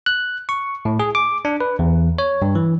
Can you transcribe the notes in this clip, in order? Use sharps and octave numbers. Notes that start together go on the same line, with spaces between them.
F#6
C#6
A2
G#4
D6
D4
B4
E2
C#5
G2
E3